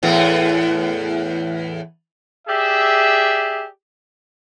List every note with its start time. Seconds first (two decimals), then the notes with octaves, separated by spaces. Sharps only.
0.03 E2 A2 B3
2.48 G4 G#4 D5 E5